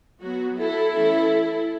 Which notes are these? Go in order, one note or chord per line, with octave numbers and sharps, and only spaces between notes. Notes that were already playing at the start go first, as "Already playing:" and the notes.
F#3 B3 F#4
E4 A4
E3 A3 C#4